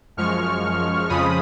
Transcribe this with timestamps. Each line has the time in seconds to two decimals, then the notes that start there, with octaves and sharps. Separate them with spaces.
0.17 F#2 F3 G#3 C#6 F6
1.09 F2 C#3 F3 G#3 B5 D#6